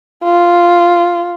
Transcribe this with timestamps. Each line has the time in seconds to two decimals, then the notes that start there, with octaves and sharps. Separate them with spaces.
0.24 F4